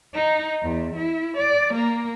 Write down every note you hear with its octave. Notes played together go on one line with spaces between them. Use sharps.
D#4
E2
E4
D5
A#3